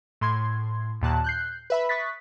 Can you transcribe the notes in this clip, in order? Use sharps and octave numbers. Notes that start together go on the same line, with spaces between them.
A2 C6 G#6
D#2 A#2 A5 F#6
F#6 G6 C7
B4 E5 B5
C#6 D#6 F#6 A6 B6